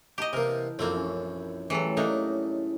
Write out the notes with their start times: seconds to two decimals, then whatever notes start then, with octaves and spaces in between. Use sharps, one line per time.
0.18 D#4 G4 D#5 A5 A#5
0.33 C3 E3 A#3 A#4
0.79 A#1 F#2 A#3 C4 A4
0.92 C#4 E4
1.70 A2 C#3 E3 F#3 G3 A4
1.97 A3 A#3 D4 D#4